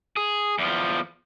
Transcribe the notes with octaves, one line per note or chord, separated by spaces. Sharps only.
G#4
E2 F3